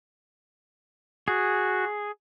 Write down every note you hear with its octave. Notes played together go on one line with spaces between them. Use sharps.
F#4 G#4